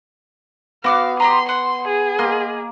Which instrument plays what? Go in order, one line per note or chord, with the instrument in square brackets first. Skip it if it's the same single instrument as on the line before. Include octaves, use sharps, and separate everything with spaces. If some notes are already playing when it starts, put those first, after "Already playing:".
[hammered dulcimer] B3 [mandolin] F#4 D6 F6 [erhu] F5
[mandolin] G4 D#5 A#5 [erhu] C6
[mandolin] F#5 [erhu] C6
[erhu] G#4
[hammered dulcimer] A#3 [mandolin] D#5 C6 F6